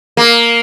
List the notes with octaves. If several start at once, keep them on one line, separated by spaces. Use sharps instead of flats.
A#3